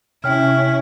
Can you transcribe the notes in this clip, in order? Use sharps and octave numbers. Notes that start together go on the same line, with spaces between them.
C3 C#4 E4 C#5 G5 F6